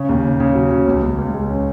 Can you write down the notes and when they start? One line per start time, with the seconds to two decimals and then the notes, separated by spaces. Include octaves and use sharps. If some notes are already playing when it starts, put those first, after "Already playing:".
Already playing: C#3 C#4
0.09 D#2
0.24 C#3
0.40 C#3
0.55 F#3
0.71 C#3
0.87 C#2
1.02 C#2
1.19 C#2
1.34 G#3
1.50 C#4